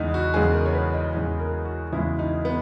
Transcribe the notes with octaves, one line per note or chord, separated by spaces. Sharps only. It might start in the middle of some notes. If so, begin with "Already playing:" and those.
Already playing: E2 C#3 E3 G#3 D#4
F#4
E2 C#3 E3 G#3 G#4
A#4
C#5
B4
D#5
E2 C#3 E3 G#3
A#4
F#4
E2 C#3 E3 G#3 E4
D#4
B3